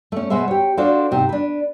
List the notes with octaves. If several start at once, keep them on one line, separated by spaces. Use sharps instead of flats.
A3 C#4
B2 G#3 B3 C5 E5
G4 C#5
D4 F4 F#4 A4 C5
G#2 C3
D4 B4